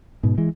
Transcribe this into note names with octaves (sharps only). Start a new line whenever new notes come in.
G#2 B2
E3 G#3